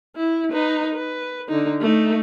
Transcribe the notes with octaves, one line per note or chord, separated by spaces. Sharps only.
E4
D#4 B4
B4
D3 D#4
A3 D#4